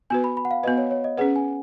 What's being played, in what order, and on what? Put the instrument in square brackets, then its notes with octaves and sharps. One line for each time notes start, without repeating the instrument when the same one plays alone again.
[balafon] B3 F#4 B4 [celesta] G#5
[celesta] B5
B5
F#5
F5
[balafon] B3 F#4 B4 [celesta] D#5
[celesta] C#5
C#5
D#5
[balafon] C#4 G#4 B4 [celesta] F#5
[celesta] G#5